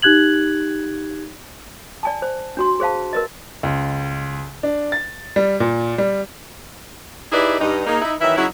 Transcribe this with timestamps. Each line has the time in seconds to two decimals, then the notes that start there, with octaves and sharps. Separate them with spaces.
0.02 D#4 G4 F#6 G#6 F#7
2.03 D5 G#5 A5
2.22 C5
2.57 D4 F#4 C6
2.80 G#4 C5 F5 A5
3.13 A#4 B4 D#5
3.63 C#2
4.63 D4
4.92 A6
5.36 G3
5.60 A#2
5.98 G3
7.32 D#4 E4 G4 G#4 B4 D5
7.61 G2 D#4
7.87 A#3 D#4 G#4
8.02 D#4 E4
8.21 D#3 E3 F#3 E4 E5
8.37 C#3 F#3 D#4 E4